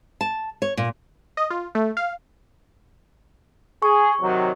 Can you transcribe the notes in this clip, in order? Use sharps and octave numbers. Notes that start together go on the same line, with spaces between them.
A5
C#5
A#2
D#5
F4
A3
F5
G#4 C#6
C3 D#3 F#3